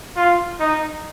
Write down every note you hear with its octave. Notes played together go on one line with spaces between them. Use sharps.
F4
D#4